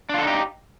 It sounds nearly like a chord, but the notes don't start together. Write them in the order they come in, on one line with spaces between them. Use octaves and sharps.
D4 F4 A4 D#4 G4